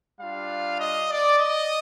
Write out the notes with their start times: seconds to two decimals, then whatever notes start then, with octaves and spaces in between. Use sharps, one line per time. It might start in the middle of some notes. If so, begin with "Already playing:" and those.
0.20 G3 D4 F4 F5
0.79 D#5
1.10 D5
1.39 D#5